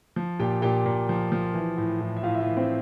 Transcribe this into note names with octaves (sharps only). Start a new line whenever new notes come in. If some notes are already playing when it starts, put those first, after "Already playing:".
F3
A#2 G4 G5
A#2 G4 G5
A#2
F3
F3
E3
A2
A2
E5
A2 F4 F5
E5
F4 F5
E3
C4 C5